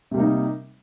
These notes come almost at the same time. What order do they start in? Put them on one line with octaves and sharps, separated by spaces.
C3 G3 A#3 D#4